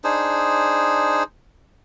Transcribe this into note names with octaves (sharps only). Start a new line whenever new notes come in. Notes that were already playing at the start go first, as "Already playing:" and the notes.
D4 D#4 G#4 C5